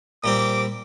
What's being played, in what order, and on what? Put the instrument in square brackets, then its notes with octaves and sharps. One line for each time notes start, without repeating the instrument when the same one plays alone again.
[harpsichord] A#2 G3 C4 [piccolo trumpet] D6